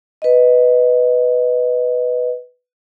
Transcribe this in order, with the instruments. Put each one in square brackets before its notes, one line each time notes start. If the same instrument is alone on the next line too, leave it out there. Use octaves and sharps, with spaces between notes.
[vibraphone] B4 D#5